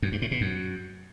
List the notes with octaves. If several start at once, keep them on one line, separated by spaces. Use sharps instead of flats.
F#2
G2
A2
B2
F#2